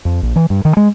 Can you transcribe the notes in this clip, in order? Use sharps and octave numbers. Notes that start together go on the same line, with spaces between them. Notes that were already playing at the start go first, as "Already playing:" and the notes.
F2
A#1
E3
G2
D#3
G#3